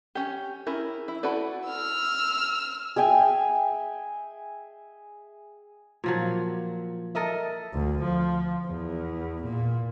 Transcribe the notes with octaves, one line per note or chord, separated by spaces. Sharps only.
C#4 G4
C#4 E4 G#4 A#4
E4
E4 F#4 A4 B4 D5
E6 F6
G#4 E5 G5 G#5
A#2 F3 F#3
A4 A#4 D#5 E5
D2
F3
E2
A#2